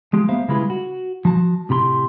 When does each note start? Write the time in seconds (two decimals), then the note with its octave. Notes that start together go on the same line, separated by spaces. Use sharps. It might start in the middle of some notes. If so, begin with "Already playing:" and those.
0.13 F3 G#3 G4
0.29 A#3 B3 C5 E5 F5
0.48 C#3 G3 G#3 E4 F4 B4
0.70 F#4
1.25 F3 F#4 A5
1.69 A2 C3 G4 B5 C6